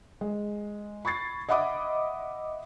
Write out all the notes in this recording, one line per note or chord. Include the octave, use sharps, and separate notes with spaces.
G#3
B5 C#6 G#6 A6 C7
D#5 E5 F#5 B5 D6 D#6